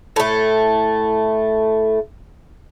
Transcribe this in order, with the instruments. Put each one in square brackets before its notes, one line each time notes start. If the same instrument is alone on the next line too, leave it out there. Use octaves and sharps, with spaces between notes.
[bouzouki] A2 A3